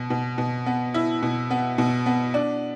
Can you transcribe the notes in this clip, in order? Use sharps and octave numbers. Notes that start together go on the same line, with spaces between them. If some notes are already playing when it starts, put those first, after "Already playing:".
Already playing: B2
B2
B2
B3
E4
B2
B3
B2
B3
D4